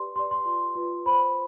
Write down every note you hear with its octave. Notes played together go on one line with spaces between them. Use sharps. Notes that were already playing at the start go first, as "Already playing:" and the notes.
Already playing: G4 B4 D5 C6
G4 B4 D5 C6
C6
F4 B4 D5
F4 B4 D5
F4 C5 B5